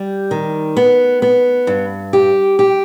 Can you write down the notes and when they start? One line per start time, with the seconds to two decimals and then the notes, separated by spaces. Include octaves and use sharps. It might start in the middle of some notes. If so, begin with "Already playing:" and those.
Already playing: G3 G4
0.31 D#3
0.77 B3
1.22 B3
1.67 G2
2.13 G4
2.59 G4